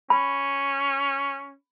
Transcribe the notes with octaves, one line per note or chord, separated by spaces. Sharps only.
C#4 B5